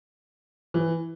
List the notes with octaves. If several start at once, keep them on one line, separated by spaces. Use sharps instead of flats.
E3